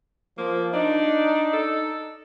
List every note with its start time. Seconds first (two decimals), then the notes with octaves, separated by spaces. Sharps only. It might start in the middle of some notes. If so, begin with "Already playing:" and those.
0.38 F3 A#3
0.73 D4 D#4
1.53 A4